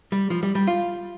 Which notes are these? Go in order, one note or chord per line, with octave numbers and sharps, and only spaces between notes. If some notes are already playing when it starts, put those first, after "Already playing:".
G3
F3
G3
G3
F4